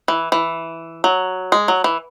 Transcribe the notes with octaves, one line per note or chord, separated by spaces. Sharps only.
E3
E3
F#3
G#3
F#3
E3